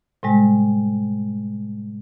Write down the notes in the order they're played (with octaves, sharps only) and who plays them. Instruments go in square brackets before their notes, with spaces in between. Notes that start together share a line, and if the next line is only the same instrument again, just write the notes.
[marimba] A2 C3 G3 G#3